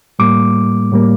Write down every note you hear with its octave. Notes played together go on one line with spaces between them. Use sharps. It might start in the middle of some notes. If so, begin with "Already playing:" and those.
A2 G3 A#3 D6
A2 G3 A#3